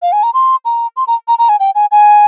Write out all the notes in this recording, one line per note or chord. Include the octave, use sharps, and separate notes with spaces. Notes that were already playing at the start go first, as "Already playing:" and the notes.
F5
G#5
A#5
C6
A#5
C6
A#5
A#5
A#5
G#5
G5
G#5
G#5